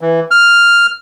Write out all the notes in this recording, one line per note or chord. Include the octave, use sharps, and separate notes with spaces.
E3
F6